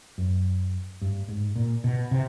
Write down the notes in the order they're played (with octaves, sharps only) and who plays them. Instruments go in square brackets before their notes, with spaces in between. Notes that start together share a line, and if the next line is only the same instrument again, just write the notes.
[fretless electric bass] F#2
G2
G#2
A#2
B2
C3